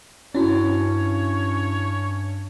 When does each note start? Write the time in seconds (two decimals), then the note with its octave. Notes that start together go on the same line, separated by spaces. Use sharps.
0.35 G2 C#4 E4 F#4 C#5